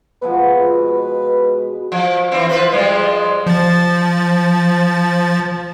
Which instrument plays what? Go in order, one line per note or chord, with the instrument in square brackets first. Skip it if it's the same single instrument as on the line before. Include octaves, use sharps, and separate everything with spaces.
[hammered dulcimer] B2 F3 G#3 [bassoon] B4
[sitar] F3
E3 C4
F4 B4 C5
F3 G3 G#3
[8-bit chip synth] F3 A6